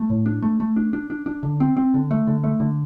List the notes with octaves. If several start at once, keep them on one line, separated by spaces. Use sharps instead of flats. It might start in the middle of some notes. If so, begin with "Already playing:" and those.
Already playing: A3
A2
D4
A3
A3
D4
D4
D4
D4
D3
C4
C4
D3
A3
D3
A3
D3